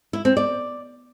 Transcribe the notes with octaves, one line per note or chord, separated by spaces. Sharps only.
E4
C4
D5